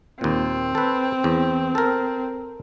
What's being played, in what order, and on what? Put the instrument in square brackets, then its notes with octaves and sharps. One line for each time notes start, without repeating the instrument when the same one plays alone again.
[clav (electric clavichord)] D#2 A#2 [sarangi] C4
[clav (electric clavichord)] A4 B4
E2
A4 A#4